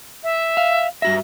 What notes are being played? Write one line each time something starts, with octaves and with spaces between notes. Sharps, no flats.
E5
F5
G2 F#4 E5 A#6